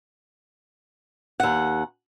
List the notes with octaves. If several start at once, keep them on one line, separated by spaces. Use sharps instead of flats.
D#2 F#5